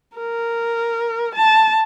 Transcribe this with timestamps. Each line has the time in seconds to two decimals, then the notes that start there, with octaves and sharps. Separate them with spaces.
0.17 A#4
1.35 A5